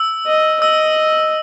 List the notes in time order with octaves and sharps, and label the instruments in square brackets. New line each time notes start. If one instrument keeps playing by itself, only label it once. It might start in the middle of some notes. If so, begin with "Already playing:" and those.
Already playing: [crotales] E6
[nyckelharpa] D#5
[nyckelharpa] D#5 [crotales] E6